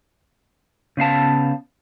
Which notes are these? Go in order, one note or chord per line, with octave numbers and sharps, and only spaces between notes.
C#3 B3 F5 A5